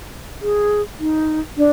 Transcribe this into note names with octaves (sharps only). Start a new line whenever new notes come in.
G#4
D#4
D4